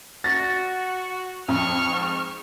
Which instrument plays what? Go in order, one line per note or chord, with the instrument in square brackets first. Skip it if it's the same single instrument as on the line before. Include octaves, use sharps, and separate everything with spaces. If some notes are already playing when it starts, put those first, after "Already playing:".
[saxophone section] F#4 [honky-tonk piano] A6 A#6
[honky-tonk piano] F2 [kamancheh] C#6 F6
[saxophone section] G#2